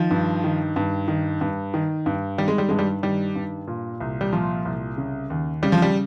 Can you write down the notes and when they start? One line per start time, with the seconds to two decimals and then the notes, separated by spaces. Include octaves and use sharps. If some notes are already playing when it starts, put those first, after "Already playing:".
Already playing: D#3 F3
0.11 G2
0.44 D#3
0.76 G2
1.08 D#3
1.41 G2
1.74 D#3
2.06 G2
2.38 D#3 G3
2.48 G#3
2.58 G3
2.69 G2 G#3
2.79 G3
3.03 D#3 G3
3.36 G2
3.67 A#2
4.00 C2
4.21 G3
4.33 A#2 F3
4.65 C2
4.97 C#3
5.30 D#2
5.63 C#3 G3
5.72 F3
5.82 G3